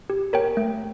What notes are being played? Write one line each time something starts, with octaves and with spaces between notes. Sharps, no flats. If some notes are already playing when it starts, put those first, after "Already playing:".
G4
A#4 C#5 G5
A3